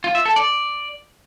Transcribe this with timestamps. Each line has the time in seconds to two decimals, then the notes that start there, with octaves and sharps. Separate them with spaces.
0.04 F4
0.15 E5
0.26 A4
0.36 D5